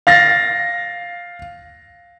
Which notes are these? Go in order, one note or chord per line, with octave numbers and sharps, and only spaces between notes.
F5 A6 A#6